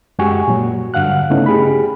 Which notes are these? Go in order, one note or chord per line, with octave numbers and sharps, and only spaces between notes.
F#2 G#3 F#4 G4 G#5 C#6
A#2 F#3
G2 D3 F5 F#5 F#6
C#3 A3 B3 C#4 D#4 E4
G4 G#4 B5